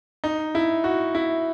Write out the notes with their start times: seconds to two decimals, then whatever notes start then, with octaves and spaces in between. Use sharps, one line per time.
0.24 D#4
0.55 E4
0.84 F#4
1.15 E4